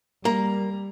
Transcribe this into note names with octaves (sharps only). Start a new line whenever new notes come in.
G3 A#3 A#5